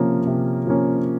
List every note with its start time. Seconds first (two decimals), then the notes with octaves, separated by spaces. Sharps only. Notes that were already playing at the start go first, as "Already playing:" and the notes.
Already playing: C3 F3 A#3 C#4
0.27 C3
0.66 F3 A#3 C#4